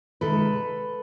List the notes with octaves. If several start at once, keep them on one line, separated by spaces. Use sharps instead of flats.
C3 D#3 G#3 A4 B4